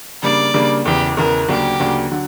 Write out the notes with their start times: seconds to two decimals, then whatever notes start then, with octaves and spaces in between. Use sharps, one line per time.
0.23 C#3 G3 A#3 D4 D5
0.54 C#3 G3 A#3 D4
0.85 E1 E2 C#3 G4
1.16 E1 E2 C#3 A#4
1.48 D2 C#3 F#3 A#3 D4 G4
1.79 D2 C#3 F#3 A#3 D4
2.11 D3 F#3